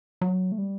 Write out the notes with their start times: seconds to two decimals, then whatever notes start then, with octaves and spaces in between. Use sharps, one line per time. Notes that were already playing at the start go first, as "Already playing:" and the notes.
0.21 F#3
0.52 A3
0.58 G3